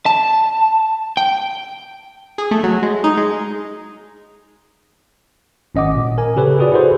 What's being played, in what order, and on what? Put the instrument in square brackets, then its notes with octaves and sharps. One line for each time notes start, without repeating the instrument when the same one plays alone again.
[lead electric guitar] A5
G5
[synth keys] G#4
A3
F#3
G#3
D#4
G#3
[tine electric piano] G#1 C#4 D#5 F#5 D6
A#2
A#4 G#5
C#3 G4 A4 B4 C#5
F4 F#4 G#4 B4 D5
E4 F#4 G#4 A4 B4 C5